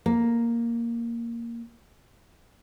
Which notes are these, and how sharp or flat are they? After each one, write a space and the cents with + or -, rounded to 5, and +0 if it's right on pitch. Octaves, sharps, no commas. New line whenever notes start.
A#3 +0